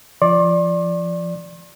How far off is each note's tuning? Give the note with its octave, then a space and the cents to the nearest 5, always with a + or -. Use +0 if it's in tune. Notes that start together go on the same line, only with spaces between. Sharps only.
F3 -25 D5 +0 C6 +45